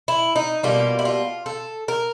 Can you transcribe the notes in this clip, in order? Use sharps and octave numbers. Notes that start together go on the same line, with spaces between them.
E4
D#4
B2 G3 A#3 F4
E4
F4
A4
A#4